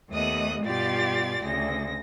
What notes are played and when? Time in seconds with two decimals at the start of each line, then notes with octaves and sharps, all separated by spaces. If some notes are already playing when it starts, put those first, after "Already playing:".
0.11 D#2 A3 B3 D#5 D#6 F#6
0.64 G2 B2 F4 G4 D5 A6
1.42 D2 C#3 A#6